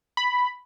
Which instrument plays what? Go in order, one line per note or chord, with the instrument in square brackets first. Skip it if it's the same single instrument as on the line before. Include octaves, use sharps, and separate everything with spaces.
[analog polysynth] B5